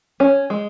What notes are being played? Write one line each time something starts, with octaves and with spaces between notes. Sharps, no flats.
C#4
G#3